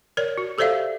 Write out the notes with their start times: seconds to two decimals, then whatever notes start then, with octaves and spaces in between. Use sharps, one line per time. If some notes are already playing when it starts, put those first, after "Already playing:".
0.17 A#4 C#5 D5
0.38 F#4
0.58 G4 A4 C5 D5 E5 F5